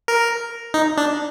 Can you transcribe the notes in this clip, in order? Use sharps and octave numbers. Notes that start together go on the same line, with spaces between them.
A#4
D#4
D4